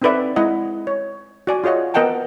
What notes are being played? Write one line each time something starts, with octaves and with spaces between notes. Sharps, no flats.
C4 D#4 A4 B4 D5 E5
G#3 E4 D#5 F#5
C#5
F#4 D5 G#5
F4 G#4 C#5 D#5 F#5
B3 A#4 D#5 F#5 G5 A5